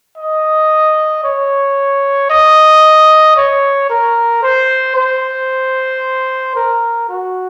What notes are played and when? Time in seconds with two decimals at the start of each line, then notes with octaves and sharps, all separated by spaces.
0.17 D#5
1.24 C#5
2.30 D#5
3.37 C#5
3.90 A#4
4.43 C5
4.96 C5
6.56 A#4
7.09 F#4